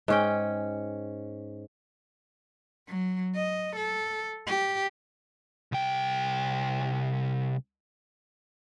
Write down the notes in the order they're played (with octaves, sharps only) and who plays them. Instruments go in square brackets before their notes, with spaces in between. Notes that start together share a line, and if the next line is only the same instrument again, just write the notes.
[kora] G#2 C#4 G5
[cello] F#3
D#5
A4
G4
[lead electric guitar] C2 G5